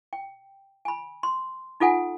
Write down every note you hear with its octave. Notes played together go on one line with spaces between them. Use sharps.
G5
G#5 B5
C6
D#4 F4 A4 F#5 G#5